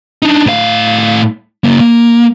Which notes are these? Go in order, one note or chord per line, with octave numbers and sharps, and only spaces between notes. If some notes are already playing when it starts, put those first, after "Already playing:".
D4 D#4
A2 F5
C#3 A#3
A#3